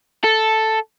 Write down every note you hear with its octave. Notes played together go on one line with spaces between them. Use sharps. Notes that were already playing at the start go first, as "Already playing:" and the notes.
A4